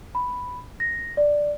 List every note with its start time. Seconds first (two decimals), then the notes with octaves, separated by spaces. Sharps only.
0.15 B5
0.80 A#6
1.17 D5